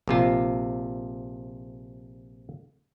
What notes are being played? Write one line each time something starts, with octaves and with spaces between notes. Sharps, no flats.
A#1 C3 F4